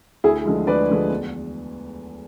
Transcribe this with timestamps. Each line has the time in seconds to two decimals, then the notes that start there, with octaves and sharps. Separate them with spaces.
0.24 D2 E4 G#4
0.46 D3 F3 G#3
0.67 D2 B4 D5
0.89 D3 F3 G#3
1.10 E2